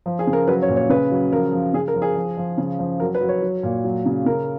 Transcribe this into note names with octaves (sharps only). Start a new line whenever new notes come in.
F3
G#4
C#3
A#4
F#3 B4
C#5
A#2
C#5
C#3 B4
F#3
F3 A#4
F3
C#3 G#4
A#4
F3
G#4
F3
F3
C#3
F3
F#3 A#4
B4
F#3
C#5
F#3
A#2
F#3
C#3
C#3 A#4